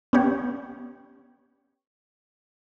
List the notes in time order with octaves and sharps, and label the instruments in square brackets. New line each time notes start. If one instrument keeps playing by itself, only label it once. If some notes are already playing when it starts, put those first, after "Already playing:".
[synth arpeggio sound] B3 C#4 G4 C#5